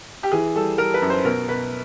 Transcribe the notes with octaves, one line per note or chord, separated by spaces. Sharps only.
G4
E3 G#4
G3 A4
G3 A#4
B4
F#2
C5
B2 A#4
B2 B4